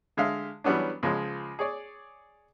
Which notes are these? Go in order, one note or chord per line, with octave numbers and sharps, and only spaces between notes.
D3 G#3 E5 F5
E3 F#3 G3 B3 C#4 D4
C#2 F3 G#3
G#4 C#5 D5